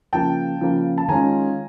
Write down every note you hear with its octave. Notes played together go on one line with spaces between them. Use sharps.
C#3 F3 A#3 G5 A5
C#3 F3 A#3
A5
D#3 G#3 C#4 F4 G#5 A#5